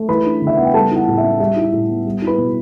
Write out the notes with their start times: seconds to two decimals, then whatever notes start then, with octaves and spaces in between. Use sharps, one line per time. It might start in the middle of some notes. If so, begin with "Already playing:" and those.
Already playing: A3
0.08 E3 B4 B5
0.25 D4
0.42 C#3
0.47 E5
0.57 B3 F#5
0.65 G5
0.74 G3 A4 A5
0.91 E4
0.96 F#5
1.08 A2
1.18 E5
1.24 C#4
1.40 G3 E5
1.56 E4
1.72 A2
1.89 B3
2.06 G3
2.22 E4
2.27 B4 B5
2.38 B2